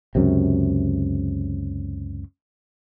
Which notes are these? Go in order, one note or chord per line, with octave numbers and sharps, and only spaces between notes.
C#2 F#2 C3